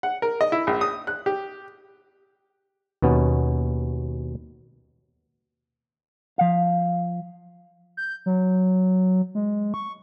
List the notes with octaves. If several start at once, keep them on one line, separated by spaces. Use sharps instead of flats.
F#5
A#4
D#5
E4
A#1
D#6
F#6
G4
D#2 B2 B3 C#4
F3 F5
G6
F#3
G#3
C#6